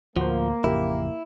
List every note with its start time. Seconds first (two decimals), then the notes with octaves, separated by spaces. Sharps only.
0.17 D2 A2 F3 A#3 F#4 C5
0.64 A1 F2 C#3 E4 G4 A#4